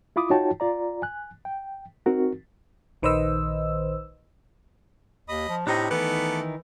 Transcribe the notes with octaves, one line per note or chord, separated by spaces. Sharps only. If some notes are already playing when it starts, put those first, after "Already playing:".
E4 F4 B5 D6 D#6
D#4 F4 F#4 C#5 G5 A5
F4 D5 A#5
G#5 F#6
G5
C4 D#4 F#4 A#4
A#1 D#3 B4 C5 D#5 E6
D#2 D#5 B5 D#6
F3
A2 C3 D4 D#4 G4 D#5
D#3 E3 A3 B3 D#4 E4 A4 D6